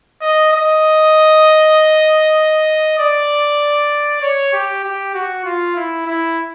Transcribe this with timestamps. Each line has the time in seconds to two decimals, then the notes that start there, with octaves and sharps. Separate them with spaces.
0.22 D#5
0.53 D#5
2.99 D5
4.22 C#5
4.53 G4
4.84 G4
5.14 F#4
5.45 F4
5.76 E4
6.06 E4